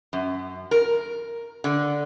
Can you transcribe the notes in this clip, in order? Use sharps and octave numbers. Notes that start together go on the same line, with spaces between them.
F#2
A#4
D3